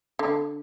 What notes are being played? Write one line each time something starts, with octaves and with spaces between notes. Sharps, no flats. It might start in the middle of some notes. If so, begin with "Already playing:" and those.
D3